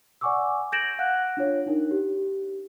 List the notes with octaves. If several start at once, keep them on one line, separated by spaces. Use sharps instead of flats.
D5 F#5 G#5 C#6 D6 E6
G6 G#6 A#6 D7 E7 F#7
F5 F#5 F#6
D4 F4 C#5
D4 D#4 A#4
G4